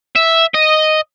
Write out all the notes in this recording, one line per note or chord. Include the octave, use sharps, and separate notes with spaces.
E5
D#5